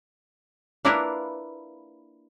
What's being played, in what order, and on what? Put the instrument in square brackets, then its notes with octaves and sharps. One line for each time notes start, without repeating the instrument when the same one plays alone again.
[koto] A#3 D4 E4 F4 A#4 B4